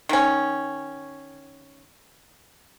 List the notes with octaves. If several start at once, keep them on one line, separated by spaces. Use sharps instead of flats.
D#3 C#4